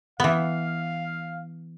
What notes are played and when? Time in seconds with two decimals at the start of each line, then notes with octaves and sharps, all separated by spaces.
0.20 E3 B3 F5